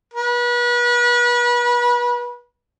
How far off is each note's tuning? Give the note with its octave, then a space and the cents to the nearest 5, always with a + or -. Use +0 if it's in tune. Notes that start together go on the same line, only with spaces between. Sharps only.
B4 -35